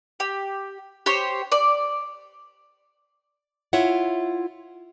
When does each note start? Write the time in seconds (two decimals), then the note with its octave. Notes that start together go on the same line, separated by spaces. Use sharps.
0.20 G4
1.06 G4 C5 C#5
1.52 D5
3.73 E4 F4 C#5 E5 F#5